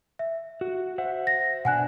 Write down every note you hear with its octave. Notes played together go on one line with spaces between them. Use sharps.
E5
F#4
C5 E5 F#5
A#6
B2 D4 F#5 G#5 F#6